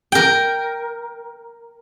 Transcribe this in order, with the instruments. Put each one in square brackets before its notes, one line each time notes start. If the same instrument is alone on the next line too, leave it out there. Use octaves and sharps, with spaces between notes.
[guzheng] A#4 G5